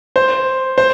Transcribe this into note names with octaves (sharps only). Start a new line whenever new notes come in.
C5
C5